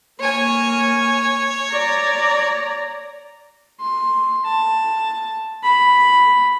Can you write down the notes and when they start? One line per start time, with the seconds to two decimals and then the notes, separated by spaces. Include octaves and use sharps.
0.21 A#3 C#5 G#5
1.72 D5 A#5
3.80 C6
4.45 A5
5.63 B5